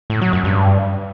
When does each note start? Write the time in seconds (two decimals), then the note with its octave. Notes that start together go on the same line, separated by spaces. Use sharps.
0.10 A2
0.21 F#3
0.33 F#2
0.45 G2